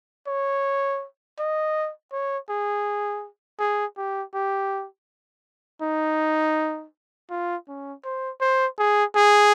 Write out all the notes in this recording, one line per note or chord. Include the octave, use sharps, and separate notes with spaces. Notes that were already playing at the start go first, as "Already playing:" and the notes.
C#5
D#5
C#5
G#4
G#4
G4
G4
D#4
F4
C#4
C5
C5
G#4
G#4